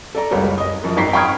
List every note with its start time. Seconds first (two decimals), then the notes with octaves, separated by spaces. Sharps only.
0.15 A4 D5 A#5
0.31 F#1 C#2 G3 G#4 C#5
0.58 D#5 D#6
0.84 F#2 F3
0.97 G#1 C4 D#4 A#5 B6 C7
1.13 G5 B5 C#6 D#6 F6 G#6